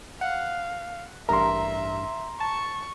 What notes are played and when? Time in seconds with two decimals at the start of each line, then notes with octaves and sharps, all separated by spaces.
0.21 F5 F#5
1.29 A1 G2 A#4 E5 A#5 C6
2.40 A5 C#6